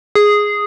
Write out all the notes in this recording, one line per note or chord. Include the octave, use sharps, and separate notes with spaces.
G#4